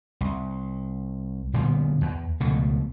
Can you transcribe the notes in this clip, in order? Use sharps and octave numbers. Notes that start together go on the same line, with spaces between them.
C2
A#2 D3 G3 B3
E2
C#2 B2 F3 A3